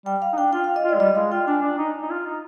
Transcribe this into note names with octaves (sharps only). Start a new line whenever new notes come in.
G3 G5
F5
D#4
D4 G5
F4 G5
F5
D#5
F4 D5
G#3
G3 D#5
G#3 F5
F4 G5
D4 G#5
D4
D#4
D#4
F4
D#4